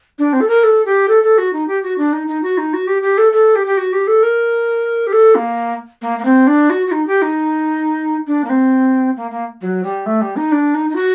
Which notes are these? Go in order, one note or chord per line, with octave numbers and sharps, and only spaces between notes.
D4
C4
A4
A#4
A4
G4
A4
A4
F#4
D#4
G4
F#4
D4
D#4
D#4
F#4
D#4
F#4
G4
G4
A4
A4
G4
G4
F#4
G4
A4
A#4
G4
A4
A#3
A#3
A#3
C4
D4
F#4
F#4
D#4
G4
D#4
D4
A#3
C4
A#3
A#3
F#3
G3
A3
G3
D#4
D4
D#4
D#4
F#4